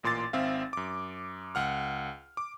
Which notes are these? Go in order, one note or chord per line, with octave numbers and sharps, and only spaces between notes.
A1 A#2 C6 D6 A6
G#1 C4 E5 F5
F#2 D6
C#2 F#5 F6
D6